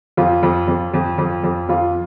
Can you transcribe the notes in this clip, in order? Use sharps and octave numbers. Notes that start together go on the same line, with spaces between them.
F2 F4
F2
F2
F2
F2
F2
F2 F4